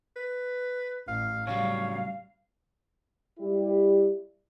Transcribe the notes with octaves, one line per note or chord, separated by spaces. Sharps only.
B4
A1 F5
A2 C#3 F#3 G3 C#5 F5
G3 E4 G4